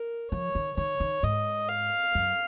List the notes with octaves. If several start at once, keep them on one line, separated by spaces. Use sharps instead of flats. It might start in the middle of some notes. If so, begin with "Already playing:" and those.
Already playing: A#4
F3 C#5
D#3
D#3 C#5
D#3
G#2 D#5
F5
F#2